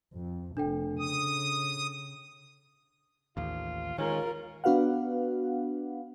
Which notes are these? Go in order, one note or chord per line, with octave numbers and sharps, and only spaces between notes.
F2
F1 D4 A4 G5
C#3 D#6
A1 D#2 F4
D#3 G#3 C#4 F4 A#4
B3 D4 F#4 B4 F5 F#5